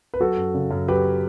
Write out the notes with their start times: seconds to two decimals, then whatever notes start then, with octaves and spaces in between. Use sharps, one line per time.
0.14 B4
0.20 F#3 F#4 A4
0.37 F#2
0.54 C#3
0.71 F#2
0.88 F#3 G4 B4